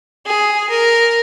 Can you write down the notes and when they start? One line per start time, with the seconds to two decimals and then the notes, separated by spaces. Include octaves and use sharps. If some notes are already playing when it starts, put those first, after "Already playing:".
0.26 G#4
0.69 A#4